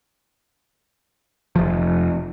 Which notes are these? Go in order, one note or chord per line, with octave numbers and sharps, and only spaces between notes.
F1 F3